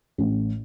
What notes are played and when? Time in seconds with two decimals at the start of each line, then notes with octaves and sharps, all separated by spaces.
0.18 A1